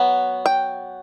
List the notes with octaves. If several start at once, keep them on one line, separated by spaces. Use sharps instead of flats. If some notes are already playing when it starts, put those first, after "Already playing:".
Already playing: F#3 B3
G5